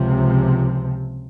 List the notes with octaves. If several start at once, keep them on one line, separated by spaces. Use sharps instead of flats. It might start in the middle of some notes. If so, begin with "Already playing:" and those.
Already playing: C#2 C3 F3